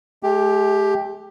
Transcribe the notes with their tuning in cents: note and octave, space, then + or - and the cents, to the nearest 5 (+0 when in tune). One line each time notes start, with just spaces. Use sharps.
A3 -45 G4 +10